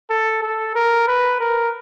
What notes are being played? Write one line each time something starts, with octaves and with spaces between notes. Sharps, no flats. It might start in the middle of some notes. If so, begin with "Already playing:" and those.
A4
A4
A#4
B4
A#4